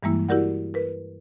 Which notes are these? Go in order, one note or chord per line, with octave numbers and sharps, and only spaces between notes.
G2 E3 G3 G#3 A#3 E4
E4 F#4 G4 A#4 D5 F#5
A#4 B4